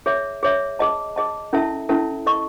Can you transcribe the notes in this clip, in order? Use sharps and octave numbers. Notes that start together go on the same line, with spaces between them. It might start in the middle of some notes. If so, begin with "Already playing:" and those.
G#4 C#5 E5
G#4 C#5 E5
G#4 D#5 A5
G#4 D#5 A5
C#4 E4 A4 E5 A5
C#4 E4 A4 E5 A5
A4 D#5 A5 C#6